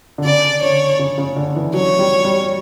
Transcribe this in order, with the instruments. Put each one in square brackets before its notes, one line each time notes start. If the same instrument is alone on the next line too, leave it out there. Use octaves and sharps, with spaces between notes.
[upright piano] D3
[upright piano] C#3 [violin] D5
[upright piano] D3 [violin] C#5
[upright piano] C#3
C#3
D3
E3
[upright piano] F#3 [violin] C#5
[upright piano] G3
G3